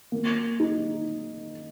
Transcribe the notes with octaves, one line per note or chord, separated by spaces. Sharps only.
A#3
D#4